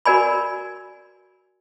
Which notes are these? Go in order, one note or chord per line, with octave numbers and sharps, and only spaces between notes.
F#4 A#4 D5 G#5 B5